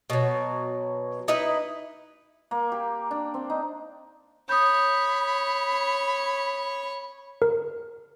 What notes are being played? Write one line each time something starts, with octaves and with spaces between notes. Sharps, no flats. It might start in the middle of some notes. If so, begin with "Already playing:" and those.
B2 F#3
D#4 E4 B4
A#3
G4
D4
C4
D#4
C#5 B5 D#6 G6
A#4